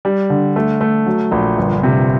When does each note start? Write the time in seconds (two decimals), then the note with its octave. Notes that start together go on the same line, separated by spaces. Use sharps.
0.05 G3
0.30 D3
0.56 A3
0.81 A3
1.06 F#3
1.32 A#1
1.57 G1
1.83 C3